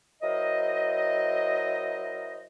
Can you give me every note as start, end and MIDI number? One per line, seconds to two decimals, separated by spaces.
0.22 2.45 54
0.22 2.45 64
0.22 2.45 70
0.22 2.45 72
0.22 2.45 75